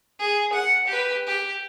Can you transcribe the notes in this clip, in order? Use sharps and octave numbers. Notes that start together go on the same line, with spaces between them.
G#4
F#5
G4 B4
G4